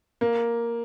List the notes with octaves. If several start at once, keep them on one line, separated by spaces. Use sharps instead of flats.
A#3